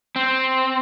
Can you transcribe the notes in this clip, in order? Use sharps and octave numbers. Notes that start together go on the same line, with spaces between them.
C4